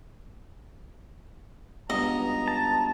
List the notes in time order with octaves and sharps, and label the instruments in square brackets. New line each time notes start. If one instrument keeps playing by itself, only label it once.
[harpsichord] C#2 G2 B2 [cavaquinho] D#5 [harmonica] A#5
[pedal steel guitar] A5